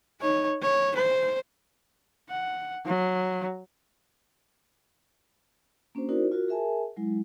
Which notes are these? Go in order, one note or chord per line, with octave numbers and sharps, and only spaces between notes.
D#4 C#5
C#5
C5
F#5
F#3
A#3 C#4 D4 F#4 C5
D#4 E4 F#4 A#4 C5 D5
F4 F#4 A#4
G#4 A#4 E5 G#5 A5
F#3 G#3 E4